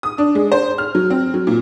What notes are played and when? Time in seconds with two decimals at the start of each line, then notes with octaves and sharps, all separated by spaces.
0.03 D#6
0.18 D4
0.35 G#3
0.52 C5
0.78 F6
0.95 F#3
1.10 C4
1.34 F#3
1.47 A#2